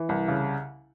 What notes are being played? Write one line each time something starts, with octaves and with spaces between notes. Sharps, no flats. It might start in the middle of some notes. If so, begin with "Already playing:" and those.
Already playing: E3
C2
C#3